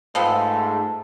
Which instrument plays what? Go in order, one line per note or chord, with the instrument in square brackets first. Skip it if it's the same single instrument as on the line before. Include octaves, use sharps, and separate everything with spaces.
[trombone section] G#2 A3 [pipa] F3 B3 C4 [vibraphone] A5